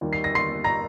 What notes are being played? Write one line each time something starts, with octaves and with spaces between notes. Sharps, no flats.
D#2 D#3 G3
C7
A#6
C6 C7
A#5 A#6